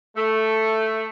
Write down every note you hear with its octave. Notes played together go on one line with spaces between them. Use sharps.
A3